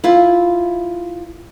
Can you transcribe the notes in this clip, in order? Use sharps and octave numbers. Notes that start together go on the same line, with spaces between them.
E4 F4